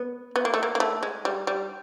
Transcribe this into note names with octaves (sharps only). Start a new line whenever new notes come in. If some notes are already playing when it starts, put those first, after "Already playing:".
Already playing: B3
B3
A#3
A3
A#3
A#3
A3
G#3
G3
G3